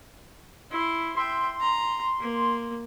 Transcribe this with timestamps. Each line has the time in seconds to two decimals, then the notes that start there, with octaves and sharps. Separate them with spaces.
0.71 E4 C6
1.16 E5 G5 C6
1.60 A#5
2.20 A#3